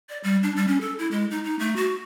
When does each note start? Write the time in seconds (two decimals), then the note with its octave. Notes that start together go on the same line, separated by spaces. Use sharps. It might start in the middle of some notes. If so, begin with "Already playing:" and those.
0.09 D5
0.24 G3
0.43 D4
0.56 G3
0.68 C#4
0.81 A4
0.99 E4
1.11 G#3
1.31 D#4
1.44 D#4
1.59 A3
1.76 F#4